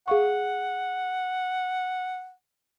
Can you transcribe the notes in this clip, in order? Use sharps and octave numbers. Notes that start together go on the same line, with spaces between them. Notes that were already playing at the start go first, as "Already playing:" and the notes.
G#4 F5 F#5 C#6